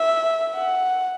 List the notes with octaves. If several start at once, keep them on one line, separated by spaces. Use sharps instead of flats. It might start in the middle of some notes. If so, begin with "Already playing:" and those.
Already playing: E5
F#5